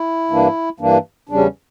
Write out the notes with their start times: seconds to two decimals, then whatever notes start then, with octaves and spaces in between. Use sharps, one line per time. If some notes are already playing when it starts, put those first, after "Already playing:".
Already playing: E4
0.30 G2 E3 A#3 D4
0.80 G2 E3 A#3 D4
1.29 E2 C#3 G3 C#4 D4